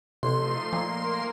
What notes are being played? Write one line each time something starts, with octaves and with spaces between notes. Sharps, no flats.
A1 C3 F3 A3 D#4 C6
A#2 F3 A#3 A#4